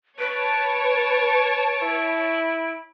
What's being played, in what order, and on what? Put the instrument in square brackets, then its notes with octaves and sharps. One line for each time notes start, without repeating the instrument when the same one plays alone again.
[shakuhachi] B4 [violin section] C#5 A5 [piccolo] D7
[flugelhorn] E4